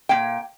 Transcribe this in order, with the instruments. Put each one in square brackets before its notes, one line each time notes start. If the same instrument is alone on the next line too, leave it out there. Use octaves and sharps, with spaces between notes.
[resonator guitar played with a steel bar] A#2 A#3 G5